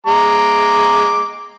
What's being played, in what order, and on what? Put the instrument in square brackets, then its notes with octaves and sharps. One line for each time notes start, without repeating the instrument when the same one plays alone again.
[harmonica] G#3 A#5 D6